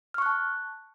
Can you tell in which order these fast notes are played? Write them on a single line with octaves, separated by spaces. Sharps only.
F6 C#6 F#6 A5